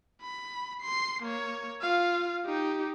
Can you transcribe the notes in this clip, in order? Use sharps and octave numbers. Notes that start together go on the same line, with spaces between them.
B5
C6 C7
A#3 C#5
F4 F5
D#4 G4